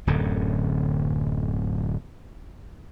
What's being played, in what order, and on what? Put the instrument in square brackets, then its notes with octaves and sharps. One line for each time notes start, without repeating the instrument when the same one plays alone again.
[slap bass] D1 F#2 D3